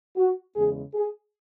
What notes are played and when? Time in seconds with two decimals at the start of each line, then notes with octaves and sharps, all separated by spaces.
0.17 F#4
0.56 E2 C#3 G#3 G#4
0.95 G#4